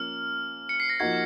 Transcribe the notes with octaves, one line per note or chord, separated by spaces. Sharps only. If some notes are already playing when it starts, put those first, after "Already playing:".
Already playing: F3 A#3 C#4 F6
C#7
C7
A#6
F3 A#3 D#4 F#4 G#6